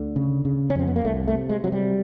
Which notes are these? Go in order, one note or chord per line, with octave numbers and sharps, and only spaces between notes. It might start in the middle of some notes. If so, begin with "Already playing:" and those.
Already playing: D2 D3
C#3
C#3
C#4
F2 C4
B3
A#3
C2 A3
A3
C3
G#3
C3 F#3
G3